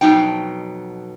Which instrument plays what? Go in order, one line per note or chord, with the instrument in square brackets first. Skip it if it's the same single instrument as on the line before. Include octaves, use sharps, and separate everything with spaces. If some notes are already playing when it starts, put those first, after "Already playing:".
[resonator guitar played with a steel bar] F2 B2 F#3 D#4 G5